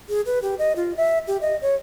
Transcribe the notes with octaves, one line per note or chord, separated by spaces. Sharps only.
G#4
B4
G4
D#5
F4
E5
G4
D#5
C#5